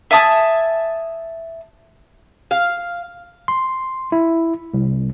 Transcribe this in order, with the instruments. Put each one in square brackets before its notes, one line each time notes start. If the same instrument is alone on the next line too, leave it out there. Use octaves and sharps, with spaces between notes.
[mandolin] E5 G#5 A5 D#6
[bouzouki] F5
[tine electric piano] C6
E4
C2